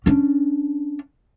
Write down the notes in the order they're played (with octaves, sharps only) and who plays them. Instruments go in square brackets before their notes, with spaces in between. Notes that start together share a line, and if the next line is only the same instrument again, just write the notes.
[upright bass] C#4 D4